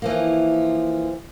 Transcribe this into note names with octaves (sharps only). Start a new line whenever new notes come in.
E3 F3 A#3